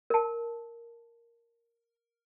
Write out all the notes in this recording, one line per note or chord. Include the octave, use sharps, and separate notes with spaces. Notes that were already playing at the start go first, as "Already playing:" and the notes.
A#4 A5